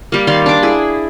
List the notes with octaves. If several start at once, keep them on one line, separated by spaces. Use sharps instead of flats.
G3 A#3
D#3 D5 F5 C6
D4 D6
E4 G#4 B5